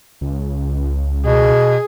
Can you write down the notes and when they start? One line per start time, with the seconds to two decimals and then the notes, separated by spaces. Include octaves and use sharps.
0.21 C#2
1.25 B2 G#4